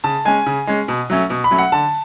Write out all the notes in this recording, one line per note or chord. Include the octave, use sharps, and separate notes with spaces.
C#3 A5
G#3 C#4 G#5
C#3
G#3 C#4
B2
F#3 A3 C#4
B2
B5
F#3 A3 C#4
F#5
D3 A5